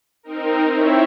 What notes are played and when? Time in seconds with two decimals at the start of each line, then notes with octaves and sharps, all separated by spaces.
0.23 C4 D#4 A#4
0.70 C4 E4 C#5 E5